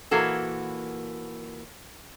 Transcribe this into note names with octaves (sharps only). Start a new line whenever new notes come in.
A#2 E3 A#3 F#4 A4